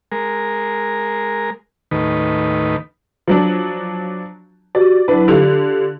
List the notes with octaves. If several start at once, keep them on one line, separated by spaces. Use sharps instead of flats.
G#3 A#4
D#2 A2 D#3 B4
F3 F#3 D4
F#4 G4 D5
F#3 D4 E4 B4
D3 F4 G4